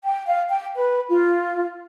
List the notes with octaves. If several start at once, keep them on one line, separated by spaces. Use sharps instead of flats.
G5
F5
G5
B4
F4